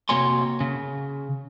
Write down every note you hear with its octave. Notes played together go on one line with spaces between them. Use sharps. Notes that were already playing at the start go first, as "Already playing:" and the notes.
C3 A#3 F#4 C#5 G#5 C6
C#3